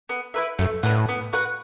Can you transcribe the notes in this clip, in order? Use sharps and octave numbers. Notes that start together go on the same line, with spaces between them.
B3
E4 B4 E5
F#2 A3
A2 D4 B4 F#5
B3
F#4 B4 F#5